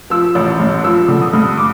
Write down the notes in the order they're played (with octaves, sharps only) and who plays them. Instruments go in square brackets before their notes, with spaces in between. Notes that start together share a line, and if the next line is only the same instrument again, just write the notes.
[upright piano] F3 E6
A1
G2
F3 E6
D3
D#6
G2
D6